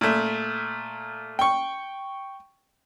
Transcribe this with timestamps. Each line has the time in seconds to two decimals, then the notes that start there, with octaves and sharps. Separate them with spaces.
0.01 A#2 A3
1.39 G5 C#6